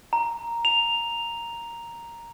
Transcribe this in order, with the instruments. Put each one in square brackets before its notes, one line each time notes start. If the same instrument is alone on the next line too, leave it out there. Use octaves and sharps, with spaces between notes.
[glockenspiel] A#5
F7